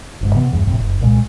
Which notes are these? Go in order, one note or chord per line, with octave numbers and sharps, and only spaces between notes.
G1 F2 G#2
C3 E3 B3
G1 E2 G2
F2 A2 C3
F#1
C2 A#2 G#3